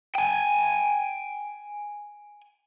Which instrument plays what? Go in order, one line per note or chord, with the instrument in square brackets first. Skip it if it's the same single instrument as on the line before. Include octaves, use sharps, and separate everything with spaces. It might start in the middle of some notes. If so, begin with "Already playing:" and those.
[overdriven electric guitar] G5 G#5